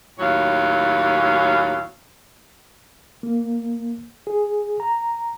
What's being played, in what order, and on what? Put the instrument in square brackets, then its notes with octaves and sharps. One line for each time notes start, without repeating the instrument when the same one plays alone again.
[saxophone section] D#2 A2 F#3 C#5 F5
[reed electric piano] A#3
G#4
A#5